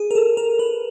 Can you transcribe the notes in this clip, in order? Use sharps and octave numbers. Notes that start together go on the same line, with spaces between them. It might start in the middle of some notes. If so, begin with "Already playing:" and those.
Already playing: G#4
A#4
A4
A#4
B4